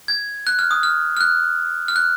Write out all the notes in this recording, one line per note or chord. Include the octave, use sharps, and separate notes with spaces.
G#6
F#6
F6
D#6
F6
F6
F#6
F6
F#6